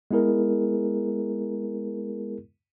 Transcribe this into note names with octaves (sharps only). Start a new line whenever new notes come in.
G#3 B3 E4 G#4 A#4